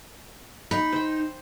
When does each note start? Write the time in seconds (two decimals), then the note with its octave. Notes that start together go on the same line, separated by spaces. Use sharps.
0.71 D#4 B5
0.93 C5 G5